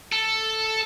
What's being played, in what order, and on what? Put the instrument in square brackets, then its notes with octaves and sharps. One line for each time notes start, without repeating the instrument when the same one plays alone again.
[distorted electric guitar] A4